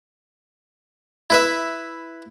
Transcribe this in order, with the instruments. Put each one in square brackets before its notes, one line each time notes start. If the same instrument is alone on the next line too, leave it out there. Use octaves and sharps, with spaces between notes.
[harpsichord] E4 B4 E5